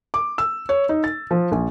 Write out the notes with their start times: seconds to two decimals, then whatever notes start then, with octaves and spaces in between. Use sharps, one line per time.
0.14 D6
0.38 E6
0.69 C#5
0.89 D#4
1.04 A6
1.31 F3
1.52 A#1